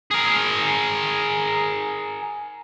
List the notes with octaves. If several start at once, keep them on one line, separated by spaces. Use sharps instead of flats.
G#4 A#4